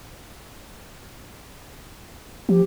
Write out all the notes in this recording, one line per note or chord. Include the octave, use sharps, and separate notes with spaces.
F3 G4